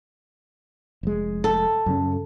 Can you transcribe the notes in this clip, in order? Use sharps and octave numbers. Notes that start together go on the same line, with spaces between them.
F1 G#3
A4
F#2 C#3 C#4